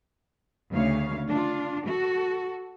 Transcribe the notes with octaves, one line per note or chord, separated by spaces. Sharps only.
D2 C#3 C#5 F5
D4 F4
F#4 A4